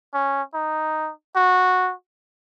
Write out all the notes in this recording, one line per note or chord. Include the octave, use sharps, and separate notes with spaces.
C#4
D#4
F#4